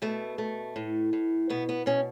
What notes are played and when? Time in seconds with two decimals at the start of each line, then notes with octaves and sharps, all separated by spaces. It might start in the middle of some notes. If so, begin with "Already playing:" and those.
0.02 B2 A3
0.38 A3
0.76 A2
1.13 A2
1.50 B2 B3
1.69 B3
1.86 B2 C#4